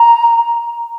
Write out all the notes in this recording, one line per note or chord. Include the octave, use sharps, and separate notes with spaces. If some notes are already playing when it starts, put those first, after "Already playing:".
Already playing: A#5